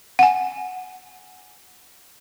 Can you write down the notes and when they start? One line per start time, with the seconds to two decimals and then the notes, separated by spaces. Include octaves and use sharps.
0.19 F#5 G#5